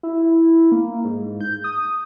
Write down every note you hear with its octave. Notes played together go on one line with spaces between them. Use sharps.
E4
A#3
G#2
G6
D#6